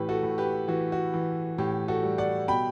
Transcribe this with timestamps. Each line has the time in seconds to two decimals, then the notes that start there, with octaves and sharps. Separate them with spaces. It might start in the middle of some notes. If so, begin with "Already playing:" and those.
Already playing: A2 E3 G4 B4
0.09 F#4 A4
0.23 A2
0.38 G4 B4
0.68 E3 F#4
0.92 F#4
1.14 E3
1.58 A2 G4
1.88 F#4 A4
2.03 G3
2.18 D5 F#5
2.48 B2 G5 B5